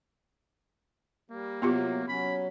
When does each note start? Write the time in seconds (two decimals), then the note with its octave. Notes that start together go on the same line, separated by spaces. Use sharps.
1.30 G3 A#3
1.62 C3 F#3 B3 F4 G4
2.08 F#3 C#4 B5